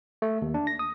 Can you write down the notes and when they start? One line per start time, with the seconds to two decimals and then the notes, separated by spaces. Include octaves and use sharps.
0.22 A3
0.42 D#2
0.54 D4
0.67 A#6
0.79 D#6